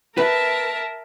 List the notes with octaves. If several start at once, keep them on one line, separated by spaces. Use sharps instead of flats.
A#4 B4 E5 A5